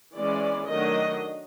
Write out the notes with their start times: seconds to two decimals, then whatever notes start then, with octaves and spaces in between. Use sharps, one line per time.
0.15 E3 G#3 C#4 D5
0.70 D#3 F#3 A3 D4 D#5